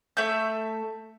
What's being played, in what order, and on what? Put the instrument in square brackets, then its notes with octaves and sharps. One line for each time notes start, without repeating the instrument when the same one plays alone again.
[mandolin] A3 E5 G6